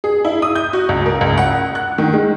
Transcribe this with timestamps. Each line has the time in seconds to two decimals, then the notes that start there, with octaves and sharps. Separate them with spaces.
0.04 G#4
0.25 E4
0.42 D#6
0.55 G6
0.73 F#4
0.89 C#2
1.06 A#4
1.21 C#2
1.38 F#5
1.75 F#6
1.98 D#3
2.13 G#3